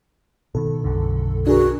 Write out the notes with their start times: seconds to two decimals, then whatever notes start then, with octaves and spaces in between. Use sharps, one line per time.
0.55 B2 D#3 A4
0.84 B1 F#2 D3
1.47 D4 F#4 G#4 A#4